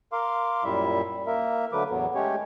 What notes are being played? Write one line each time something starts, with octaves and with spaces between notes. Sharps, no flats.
A#4 F5 C6 D6
F#2 A#2 G3 E4 E5
A#3 A#4 E5
D3 F#3 A3 B4 D6
E2 A2 F#3 B3
G#3 A3 C#4 G4 C#5